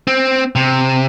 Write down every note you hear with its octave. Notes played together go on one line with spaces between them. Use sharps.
C4
C3